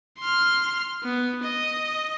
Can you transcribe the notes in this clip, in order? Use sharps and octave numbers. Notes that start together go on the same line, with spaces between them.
C6 F6
B3
D#5